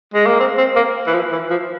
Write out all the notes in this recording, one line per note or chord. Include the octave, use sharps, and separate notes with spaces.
G#3
A#3
C4
C4
A#3
E3
F3
E3
F3